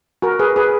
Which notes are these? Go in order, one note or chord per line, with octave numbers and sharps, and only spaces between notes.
F#4 A#4
G#4 B4
G#4 B4